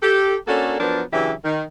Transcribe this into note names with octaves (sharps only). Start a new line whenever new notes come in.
G4 A4
A#3 C#4 D4 F#4 A4
F3 F#3 B3 D4 A#4
C#3 E3 F#3 D4 G4 E5
D#3